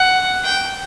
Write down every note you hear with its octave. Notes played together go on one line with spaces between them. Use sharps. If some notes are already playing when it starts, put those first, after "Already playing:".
Already playing: F#5
G5